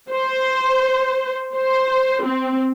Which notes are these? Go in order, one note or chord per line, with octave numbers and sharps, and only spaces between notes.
C5
C5
C4